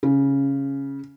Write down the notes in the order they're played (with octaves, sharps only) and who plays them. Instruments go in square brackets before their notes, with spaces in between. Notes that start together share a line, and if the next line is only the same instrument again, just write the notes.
[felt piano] C#3